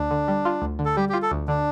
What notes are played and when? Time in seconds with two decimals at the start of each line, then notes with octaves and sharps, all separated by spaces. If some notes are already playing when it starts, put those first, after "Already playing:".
Already playing: D2 D4
0.11 D3
0.28 G3
0.45 F4
0.62 D2
0.79 D3
0.85 A4
0.97 G3 G4
1.09 G4
1.13 F4
1.22 A4
1.31 D2
1.48 D3 D4